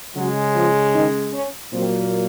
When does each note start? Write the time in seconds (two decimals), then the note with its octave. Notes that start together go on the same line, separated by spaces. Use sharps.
0.16 C#3 F#3 G#3 F#4
0.56 F3 F4
0.95 D#3 D#4
1.34 C#4
1.73 A#2 F#3 A#3 C4